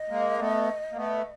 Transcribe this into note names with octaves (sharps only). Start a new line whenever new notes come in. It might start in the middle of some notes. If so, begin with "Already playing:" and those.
Already playing: D#5
G#3 A#3
A3 B3
A#3
A3 B3